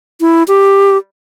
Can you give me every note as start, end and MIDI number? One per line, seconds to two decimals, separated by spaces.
0.21 0.43 64
0.48 0.97 67